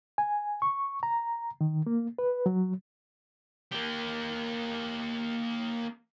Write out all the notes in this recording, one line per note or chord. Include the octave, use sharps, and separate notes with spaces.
G#5
C#6
A#5
D#3
A#3
B4
F#3
A#3 G4